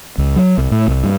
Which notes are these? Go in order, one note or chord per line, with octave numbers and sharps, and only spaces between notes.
C#2
F#3
C2
A2
C2
G2